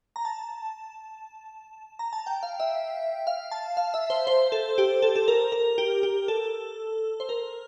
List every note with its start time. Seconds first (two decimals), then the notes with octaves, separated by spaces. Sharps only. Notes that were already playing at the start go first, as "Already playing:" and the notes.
0.16 A#5
0.25 A5
1.99 A#5
2.13 A5
2.27 G5
2.43 F5
2.60 E5
3.27 F5
3.51 A5
3.77 F5
3.94 E5
4.10 C5
4.27 C5
4.52 A4
4.78 G4
5.02 A4
5.16 A4
5.28 A#4
5.52 A#4
5.78 G4
6.03 G4
6.28 A4
7.20 C5
7.29 A#4